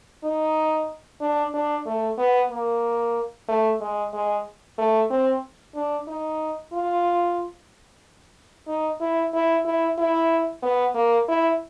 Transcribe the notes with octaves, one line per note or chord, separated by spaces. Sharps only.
D#4
D4
D4
A3
B3
A#3
A3
G#3
G#3
A3
C4
D4
D#4
F4
D#4
E4
E4
E4
E4
B3
A#3
E4